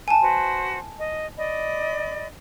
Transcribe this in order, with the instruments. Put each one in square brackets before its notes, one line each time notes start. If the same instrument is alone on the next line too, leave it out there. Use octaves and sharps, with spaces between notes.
[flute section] F#5 [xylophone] G#5 A5
[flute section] F#4 B4 C5
D#5
D5 D#5 B5